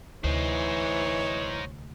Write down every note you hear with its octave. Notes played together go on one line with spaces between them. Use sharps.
D2 C3 E3 D#4 C5 C#5